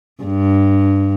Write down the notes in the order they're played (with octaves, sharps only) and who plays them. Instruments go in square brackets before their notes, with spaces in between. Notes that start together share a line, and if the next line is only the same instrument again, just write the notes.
[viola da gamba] G2